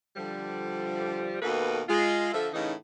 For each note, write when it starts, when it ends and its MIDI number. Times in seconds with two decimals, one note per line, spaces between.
0.16 1.36 50
0.16 1.36 53
0.16 1.36 55
1.42 1.82 39
1.42 1.82 47
1.42 1.82 58
1.42 1.82 66
1.42 1.82 69
1.42 1.82 71
1.88 2.30 56
1.88 2.30 65
2.33 2.48 50
2.33 2.48 53
2.33 2.48 69
2.33 2.48 76
2.53 2.73 45
2.53 2.73 49
2.53 2.73 52
2.53 2.73 63